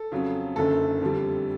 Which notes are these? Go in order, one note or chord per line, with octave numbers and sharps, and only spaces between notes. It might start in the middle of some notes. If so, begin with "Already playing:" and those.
Already playing: A4
F2 C#3 F#3
F#1 F#2 D3 A4
F2 D3 G3